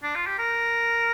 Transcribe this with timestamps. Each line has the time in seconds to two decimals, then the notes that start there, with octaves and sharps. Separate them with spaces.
0.03 D4
0.15 F4
0.27 G4
0.39 A#4